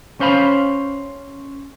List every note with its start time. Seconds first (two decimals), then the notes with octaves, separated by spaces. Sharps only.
0.20 C#4 C5 F5 B5